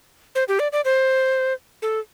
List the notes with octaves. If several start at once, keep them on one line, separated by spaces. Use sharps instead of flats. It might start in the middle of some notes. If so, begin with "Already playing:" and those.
C5
G4
D5
D5
C5
A4